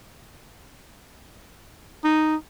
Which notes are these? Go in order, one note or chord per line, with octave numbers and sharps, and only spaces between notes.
D#4